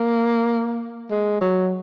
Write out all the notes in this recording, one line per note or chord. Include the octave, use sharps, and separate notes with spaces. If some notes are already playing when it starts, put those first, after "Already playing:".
Already playing: A#3
G#3
F#3